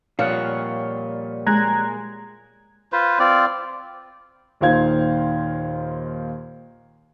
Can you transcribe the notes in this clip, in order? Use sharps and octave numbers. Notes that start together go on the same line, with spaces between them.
F2 A#2 G3 C#5 F5 F#5
G#3 A#5 F#6 G#6
F4 B4 C5
C4 F4 D5
D#2 A#2 D#3 C5 F5 G#6